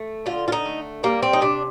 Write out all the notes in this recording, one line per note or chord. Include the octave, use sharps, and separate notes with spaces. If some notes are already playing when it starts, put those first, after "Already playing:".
Already playing: A3
D3 F4
F4
D#4
A3
G3 A#3
C4
D#4
C3 D4